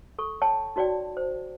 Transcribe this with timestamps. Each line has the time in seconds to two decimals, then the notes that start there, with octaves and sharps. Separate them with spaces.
0.19 A4 C#6
0.42 C#5 G5 A5
0.76 D#4 F#4 C#5 D5 G5
1.17 C5